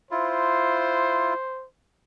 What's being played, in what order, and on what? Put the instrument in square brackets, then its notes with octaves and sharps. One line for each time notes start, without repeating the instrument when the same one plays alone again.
[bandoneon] E4 F4 [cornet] C5